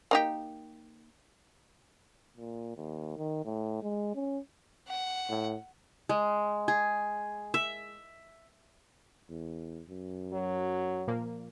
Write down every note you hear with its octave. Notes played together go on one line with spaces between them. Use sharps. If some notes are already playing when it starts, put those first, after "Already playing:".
A#3 D#4 G4
A#2
D#2
D#3
A2
G#3
C#4
F#5
A2
G#3
G#4
E5
E2
F#2
F#3
A#2 F3 A#3